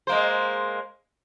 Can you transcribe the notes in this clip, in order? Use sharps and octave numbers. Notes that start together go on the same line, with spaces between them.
G#3 A#3 C5